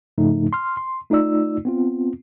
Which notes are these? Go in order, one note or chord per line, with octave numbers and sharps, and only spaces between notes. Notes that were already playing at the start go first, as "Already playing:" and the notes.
G#2 C#3 F3 A3 D#4
C6 F6
C6
A3 D#4 F4 D5 E6
B3 C4 F4